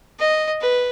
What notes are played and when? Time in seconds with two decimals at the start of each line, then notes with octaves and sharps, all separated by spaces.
0.20 D#5
0.61 B4